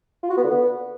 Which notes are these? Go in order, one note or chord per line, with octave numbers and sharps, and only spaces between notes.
F4
F#4
B3
D3
B3